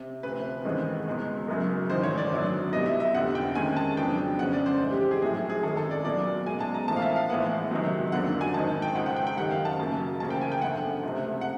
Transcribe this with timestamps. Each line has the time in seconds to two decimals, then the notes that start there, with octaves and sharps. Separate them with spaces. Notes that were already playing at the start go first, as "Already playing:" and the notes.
Already playing: C3
0.23 D2 C3 F3 B4
0.65 A1 G2 D#3 G#3 C4
1.06 C#2 B2 G#3
1.48 F#1 F#2 C#3 F#3
1.90 A1 G#2 D#3 C5
2.04 C#5
2.18 D5
2.31 G#1 F#2 D3 F#3 B3
2.72 C2 B2 G3 D#5
2.86 E5
3.00 E5
3.14 F1 F2 D3 G3 C4 F#5
3.35 G5
3.55 D#2 D#3 G#3 C#4 G#5
3.77 A5
3.97 F2 C#3 F#3 B3 D4 G5
4.39 F2 C#3 F3 G#3 C#4 F#5
4.53 D5
4.66 C5
4.80 G#2 E3 G#3 C4
4.91 G4
5.01 G4
5.11 G#4
5.22 A#1 A2 F#3 A3 C4 G#4
5.35 G#4
5.50 G#4
5.63 G#1 F#2 D#3 A4
5.77 A4
5.91 D5
6.05 B1 A#2 F#3 A#3 D5
6.46 B1 B2 G#3 G#5
6.60 A5
6.74 A#5
6.88 A1 A2 F3 A#3 A5
6.96 F5
7.02 E5
7.16 F5
7.29 A#1 A2 E3 G#3 B3 F#5
7.71 C#2 C3 D#3 F#3
8.12 F2 D3 F#3 A#3 D4 F#5
8.41 G#5
8.54 G#1 G#2 D#3 A5
8.82 G5
8.95 C#2 C#3 F3 F#5
9.06 F#5
9.16 G5
9.27 G5
9.37 F#2 D#3 G3 F#5
9.51 F5
9.65 A5
9.79 F#2 C#3 F#3 A#3
10.20 E1 D2 C#3 F3 A#3 A5
10.30 G5
10.41 G#5
10.52 G5
10.61 G1 F#2 D3 F#5
11.03 C#2 C3 F3 A3
11.41 F#5